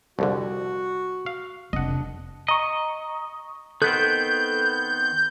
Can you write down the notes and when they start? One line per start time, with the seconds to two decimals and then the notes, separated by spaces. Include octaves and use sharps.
0.19 C2 F2 D3 F#4
1.26 F5
1.73 F1 D4 D#5 F#5
2.48 D#5 A#5 C#6
3.82 D#3 B3 C4 A4 F#6 G6